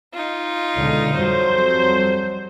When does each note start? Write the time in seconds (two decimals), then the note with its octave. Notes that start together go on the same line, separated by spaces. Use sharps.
0.13 D#4 F4
0.74 C#2 B2 D3
1.13 F2 F#3 G3 C5